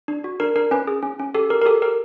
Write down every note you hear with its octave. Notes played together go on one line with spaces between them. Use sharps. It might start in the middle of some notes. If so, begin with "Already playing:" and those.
D4
F#4
D4 A#4
D4 A#4
C#4 B4
G#4
C#4
C#4
G4 A4
G4 A#4
A#4
G4 A4
G4 A#4